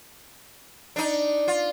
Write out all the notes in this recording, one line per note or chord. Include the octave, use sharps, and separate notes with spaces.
D4 D#4
F4